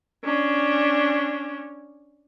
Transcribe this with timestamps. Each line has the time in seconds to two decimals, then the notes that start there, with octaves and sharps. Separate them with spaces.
0.24 C#4 D4